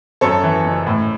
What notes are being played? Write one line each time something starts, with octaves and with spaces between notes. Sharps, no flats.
F#2 A4 C#5
E3
F#1
A2